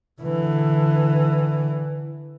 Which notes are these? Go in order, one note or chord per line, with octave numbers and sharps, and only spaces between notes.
D3 E3